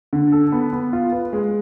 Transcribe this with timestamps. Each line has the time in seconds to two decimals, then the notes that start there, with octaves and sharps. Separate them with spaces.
0.13 D3
0.32 A4
0.52 B3
0.73 B3
0.93 F4
1.12 B4
1.33 G#3